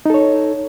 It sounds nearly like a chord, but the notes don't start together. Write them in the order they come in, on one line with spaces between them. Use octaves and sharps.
D#4 A4 C#5